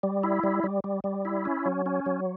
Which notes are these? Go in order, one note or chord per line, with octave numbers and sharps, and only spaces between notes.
G3
E4
G3
G3
G3
G3
E4
C#4
F#3
C#4
F#3